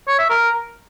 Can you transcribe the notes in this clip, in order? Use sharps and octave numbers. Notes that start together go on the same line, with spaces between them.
C#5
E5
A#4